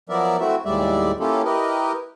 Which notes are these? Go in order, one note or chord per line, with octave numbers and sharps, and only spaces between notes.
F3 F#3 B3 A#4 D5 E5
A3 C4 E4 F#4 E5
D#2 A2 G3 G#3 D5 E5
A#3 C#4 E4 F4 G4 A4
E4 G4 A#4 B4 D#5